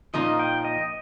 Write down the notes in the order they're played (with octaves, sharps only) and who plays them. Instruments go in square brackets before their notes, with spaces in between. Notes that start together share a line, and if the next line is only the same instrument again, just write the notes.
[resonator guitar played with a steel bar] A#2 F3 A#3 D#4 [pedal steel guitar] D#5
[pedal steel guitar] G5
D#5